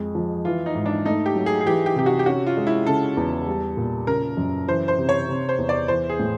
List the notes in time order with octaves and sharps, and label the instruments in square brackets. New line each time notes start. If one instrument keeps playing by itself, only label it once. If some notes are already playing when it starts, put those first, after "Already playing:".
Already playing: [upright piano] F2 G#3
F3
[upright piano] E3 [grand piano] F4
[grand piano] D#4
[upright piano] G#2
[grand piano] D4
[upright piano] A3 [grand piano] D#4
[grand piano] G4
[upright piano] F#3
[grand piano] G#4
G#4
[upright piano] E3 [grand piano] G4
[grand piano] G4
[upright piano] C3 [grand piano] G4
[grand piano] F#4
G4
[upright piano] C#4 [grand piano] F#4
[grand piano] F4
[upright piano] G#3
[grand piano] E4
[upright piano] C#3 [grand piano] A4
[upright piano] E2
G3
A#2
[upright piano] C#3 [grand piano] A#4
[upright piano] F#2
[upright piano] E3 [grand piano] C5
[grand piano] C5
[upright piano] C3
[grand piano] C#5
[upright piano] C3
[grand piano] C5
[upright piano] E2
[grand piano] D5
[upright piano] E3 [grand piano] C5
[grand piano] G#4
[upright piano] A2